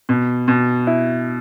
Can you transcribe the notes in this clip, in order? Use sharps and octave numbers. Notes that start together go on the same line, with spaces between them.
B2
B2
E4